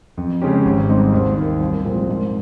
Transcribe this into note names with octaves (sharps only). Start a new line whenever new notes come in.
F2
C#3 G#3 C#4 G4
G#1
G#2 G3 C4 D#4
D#2
D#3 A#3
C2
A#2 F3 G#3 C4
G#2